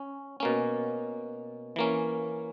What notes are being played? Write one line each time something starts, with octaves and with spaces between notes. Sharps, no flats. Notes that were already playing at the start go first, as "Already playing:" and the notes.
Already playing: C#4
B2 A#3 C#4
E3 A#3 C#4